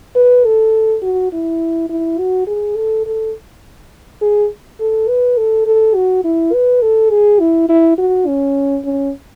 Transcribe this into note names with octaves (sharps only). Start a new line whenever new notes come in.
B4
A4
F#4
E4
E4
F#4
G#4
A4
A4
G#4
A4
B4
A4
A4
F#4
E4
B4
A4
G#4
E4
E4
F#4
C#4
C#4